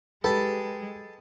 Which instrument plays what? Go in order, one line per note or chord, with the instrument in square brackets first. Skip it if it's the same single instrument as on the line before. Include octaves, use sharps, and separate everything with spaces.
[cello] G#3 [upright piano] G4 [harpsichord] A4 A5 [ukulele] B4